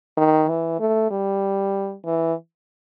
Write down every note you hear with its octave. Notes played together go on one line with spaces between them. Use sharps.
D#3
E3
A3
G3
E3